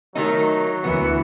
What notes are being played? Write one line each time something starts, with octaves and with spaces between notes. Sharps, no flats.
D#3 F#3 A3 D#4
D2 E3 B3 C#7